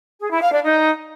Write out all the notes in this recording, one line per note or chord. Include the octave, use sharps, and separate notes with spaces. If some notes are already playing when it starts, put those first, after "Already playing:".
G#4
E4
F5
D4
D#4